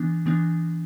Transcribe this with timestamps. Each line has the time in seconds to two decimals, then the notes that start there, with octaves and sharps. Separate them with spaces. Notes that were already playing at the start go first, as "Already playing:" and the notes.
Already playing: E3 B3 D4
0.26 E3 B3 D4